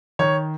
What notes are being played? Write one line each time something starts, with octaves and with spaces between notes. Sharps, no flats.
D#3 C#5